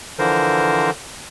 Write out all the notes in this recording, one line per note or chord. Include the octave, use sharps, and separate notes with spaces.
D3 E3 F3 A#4 C5